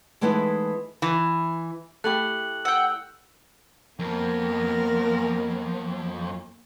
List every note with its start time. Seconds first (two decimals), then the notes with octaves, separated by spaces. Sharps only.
0.21 E3 G#3 A3 B3 D#4 E4
1.02 E3
2.04 A3 E4 G4 F#6 F#7
2.65 F#5 G5 E6
3.99 F2 A#3 B3 A#4